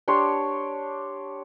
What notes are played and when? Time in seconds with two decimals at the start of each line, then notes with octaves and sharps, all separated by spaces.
0.08 D4 G4 C#5 C6